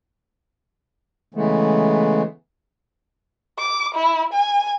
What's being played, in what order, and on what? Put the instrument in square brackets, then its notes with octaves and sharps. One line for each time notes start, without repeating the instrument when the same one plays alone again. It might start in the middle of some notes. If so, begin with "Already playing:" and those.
[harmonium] C#3 E3 G#3 A3 B3
[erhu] D6
E4
G#5